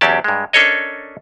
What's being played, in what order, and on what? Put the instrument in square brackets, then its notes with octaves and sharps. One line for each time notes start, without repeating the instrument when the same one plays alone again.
[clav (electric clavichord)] E2 F#3 C#4 G4 D5 A5
G2 G#3
C#4 D4 A4 A#4 C#5 D#5